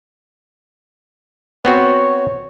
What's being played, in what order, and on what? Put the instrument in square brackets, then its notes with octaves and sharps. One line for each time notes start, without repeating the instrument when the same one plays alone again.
[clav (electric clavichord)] B3 C4 F#4 [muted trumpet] C#5